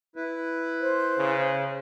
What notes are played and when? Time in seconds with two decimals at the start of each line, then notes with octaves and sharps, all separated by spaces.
0.16 E4 B4
0.81 C5
1.18 C#3